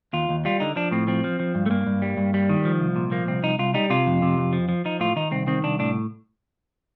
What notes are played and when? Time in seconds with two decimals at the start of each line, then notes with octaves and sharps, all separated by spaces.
0.13 D#2 F4
0.29 D#2
0.45 G3 F4
0.60 D3 D#4
0.76 F3 D4
0.92 A2 C4
1.07 F3 C4
1.24 F3
1.40 F3
1.55 G2
1.66 A3
1.70 G2 A#3
1.87 G2
2.02 G3
2.17 G2
2.34 G3
2.50 D#3
2.65 F3
2.80 C2
2.96 A#2
3.12 F3 A#3
3.28 C2 C4
3.43 C2 D#4
3.59 C2 F4
3.74 G3 D#4
3.90 C3 F4
4.07 F2
4.22 C3
4.38 F2
4.53 F3
4.69 F3
4.85 F3 D#4
5.00 A2 F4
5.16 D#3 D#4
5.32 C2 C4
5.47 D#3 C4
5.63 C2 D4
5.79 A2 D4